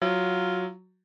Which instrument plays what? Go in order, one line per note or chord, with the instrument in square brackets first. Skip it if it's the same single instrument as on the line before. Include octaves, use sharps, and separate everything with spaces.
[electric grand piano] F#3 [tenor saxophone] F4